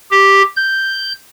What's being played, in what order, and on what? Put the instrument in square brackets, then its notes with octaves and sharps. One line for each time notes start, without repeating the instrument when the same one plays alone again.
[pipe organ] G4
G6